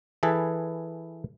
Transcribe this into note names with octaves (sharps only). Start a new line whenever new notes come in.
E3 G#4 A4 B4